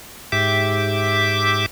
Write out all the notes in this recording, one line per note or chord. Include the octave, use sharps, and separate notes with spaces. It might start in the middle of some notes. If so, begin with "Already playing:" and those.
G#2 G4 E5 D6